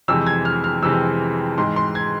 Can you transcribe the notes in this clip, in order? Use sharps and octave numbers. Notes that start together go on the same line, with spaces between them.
F2 C3 E3 G#3 C4 E6
G#6
F6
F6
F2 C3 E3 G#3 C4 E6
G#2 E3 G#3 C6
C6
G#6